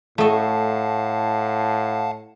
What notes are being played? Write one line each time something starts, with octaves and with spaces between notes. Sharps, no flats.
A2 A3 D#5 F5 F#5 A5